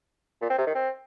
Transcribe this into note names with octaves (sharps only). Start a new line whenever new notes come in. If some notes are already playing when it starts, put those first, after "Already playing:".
A#2
C4
C3
D#3
C4